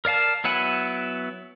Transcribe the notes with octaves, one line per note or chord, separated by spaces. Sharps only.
A#4 D5 F5 A5
F#3 B3 E4 F#5 G#5